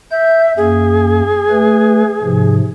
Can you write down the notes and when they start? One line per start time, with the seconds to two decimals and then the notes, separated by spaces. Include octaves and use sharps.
0.11 E5 G6
0.57 F#2 A#3 G#4
1.50 A3 B4
2.22 G#2 C3 F3